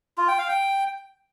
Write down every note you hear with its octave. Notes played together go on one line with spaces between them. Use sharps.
F4
G5
F5
G5